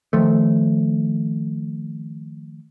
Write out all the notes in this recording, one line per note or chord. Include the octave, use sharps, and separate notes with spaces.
D#3 F3 A3